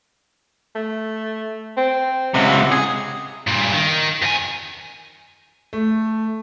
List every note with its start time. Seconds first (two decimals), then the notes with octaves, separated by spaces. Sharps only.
0.75 A3
1.77 C4
2.34 C#2 C3 F#5
2.72 G#4
3.47 G2 A#2
3.74 D#3
4.22 F2 G#5
5.73 A3